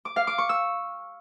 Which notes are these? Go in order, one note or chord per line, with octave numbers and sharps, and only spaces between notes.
D6
F5
D6
C#6
E6